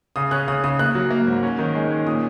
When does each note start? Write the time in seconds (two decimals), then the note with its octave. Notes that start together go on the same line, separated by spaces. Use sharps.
0.16 C#3 D#6
0.31 C#4 F#6
0.48 C#3 D#6
0.64 C#3 D#6
0.79 A#3 F#6
0.95 F#3
1.11 A#3
1.27 G#2
1.43 C#4
1.59 D#3
1.75 G#3
1.91 C#4
2.07 A#2 D#6